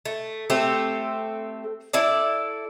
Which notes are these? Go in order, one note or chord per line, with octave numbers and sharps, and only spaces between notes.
A3
A3 C4 G4 A4
E4 A4 D5